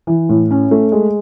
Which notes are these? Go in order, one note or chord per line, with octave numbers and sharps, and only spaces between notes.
E3
A2
C#4
A3
G#3